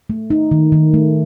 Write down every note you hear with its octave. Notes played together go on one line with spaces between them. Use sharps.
A3
D#4
D#3
D#3
A3